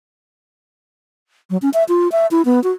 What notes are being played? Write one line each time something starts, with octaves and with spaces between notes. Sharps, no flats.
F#3
C#4
E5
F4
E5
E4
B3
F#4